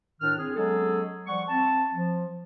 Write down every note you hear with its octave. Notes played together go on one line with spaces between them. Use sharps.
A2 D#3 D4 F6
C4 G#4
F#3 G#3 B3 C#4 G#4 A4
F3 G3 F#5 C#6
C4 A5
F3